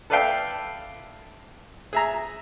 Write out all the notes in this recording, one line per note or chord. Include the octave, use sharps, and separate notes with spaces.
A4 B4 D5 E5 F5 G5
G#4 E5 A#5